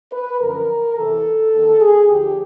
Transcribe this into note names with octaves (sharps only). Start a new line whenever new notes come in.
B4
F#2 D3 F3 A#4
E2 C3 E3 A4
D#2 D#3
G#4
D2 D3 F3 G4